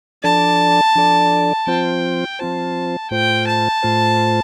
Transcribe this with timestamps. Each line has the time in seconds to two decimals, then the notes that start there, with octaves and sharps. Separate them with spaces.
0.23 F3 D4 A4 D5 A5
0.95 F3 D4 A4 D5
1.67 F3 C4 F4 C5 G5
2.39 F3 C4 F4 C5 A5
3.11 A2 A3 F4 C5 G5
3.47 A5
3.82 A2 A3 F4 C5